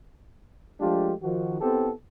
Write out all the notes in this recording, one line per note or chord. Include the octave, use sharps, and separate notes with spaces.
F3 G#3 A3 D4 F4 G4
D#3 F3 F#4
B3 C4 E4 G4 A4